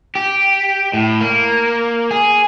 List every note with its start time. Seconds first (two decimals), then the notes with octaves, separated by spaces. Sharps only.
0.15 G4
0.93 A2
1.21 A#3
2.11 G#4